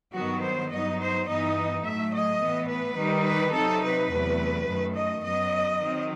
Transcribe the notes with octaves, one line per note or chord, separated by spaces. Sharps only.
G2 D#3 F#3 B3 F#4
C5
G2 F#3 B3 D#4 D#5
C5
G2 E3 B3 D#4 D#5
A2 F#3 A3 E5
D#5
A2 E3 B3
B4
D#3 G3 D#4
B4
C3 F#3 C4 D#4 A4
B4
E2 C3 F#3 A3
F#2 D#3 A3
D#5
F#2 F#3 B3 D#5
D#3 F#3 C4